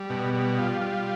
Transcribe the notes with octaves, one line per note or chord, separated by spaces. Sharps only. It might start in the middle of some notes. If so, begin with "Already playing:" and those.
Already playing: G3
B2
G3
F4
G3